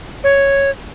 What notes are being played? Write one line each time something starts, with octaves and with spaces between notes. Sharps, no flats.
C#5